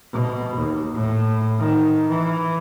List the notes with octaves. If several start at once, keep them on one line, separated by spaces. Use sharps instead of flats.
B2
D#2
A2
D#3
E3